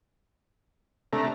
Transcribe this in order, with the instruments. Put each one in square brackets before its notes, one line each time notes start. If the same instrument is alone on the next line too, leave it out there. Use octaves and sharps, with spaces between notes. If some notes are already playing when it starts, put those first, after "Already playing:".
[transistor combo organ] C3 D4 A#5 [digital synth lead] A3